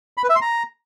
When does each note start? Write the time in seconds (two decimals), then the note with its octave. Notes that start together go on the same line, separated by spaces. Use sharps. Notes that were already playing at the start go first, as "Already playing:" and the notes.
0.17 B5
0.24 B4
0.30 E5
0.36 C6
0.42 A#5